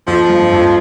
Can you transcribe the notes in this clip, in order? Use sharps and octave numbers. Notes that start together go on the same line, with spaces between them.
F2 F3
G2
F2